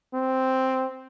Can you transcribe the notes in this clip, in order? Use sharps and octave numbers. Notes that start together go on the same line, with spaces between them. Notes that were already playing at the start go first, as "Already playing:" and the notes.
C4